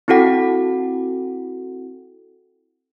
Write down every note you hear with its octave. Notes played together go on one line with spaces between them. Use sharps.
C4 E4 F#4 A4 F#5 G5